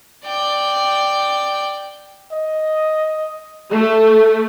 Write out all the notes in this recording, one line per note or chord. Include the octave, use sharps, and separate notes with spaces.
D5 G5
D#5
A3